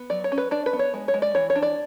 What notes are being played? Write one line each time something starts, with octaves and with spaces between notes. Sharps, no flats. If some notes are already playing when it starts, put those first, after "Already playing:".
Already playing: B3
F#3 D5
C#5
C#4
B4
D4 D5
B4
B3
C#5
G#3
C#5
G#3
D5
E3 C#5
C#5
D4
D5